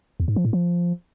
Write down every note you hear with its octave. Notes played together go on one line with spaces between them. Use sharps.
E2
G#2
F3
A2
F3